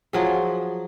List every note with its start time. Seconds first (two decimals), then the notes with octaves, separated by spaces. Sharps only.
0.13 F3 F#3 G#4